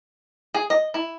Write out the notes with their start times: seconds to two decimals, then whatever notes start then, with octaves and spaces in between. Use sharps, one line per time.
0.54 G#4
0.70 D#5
0.94 E4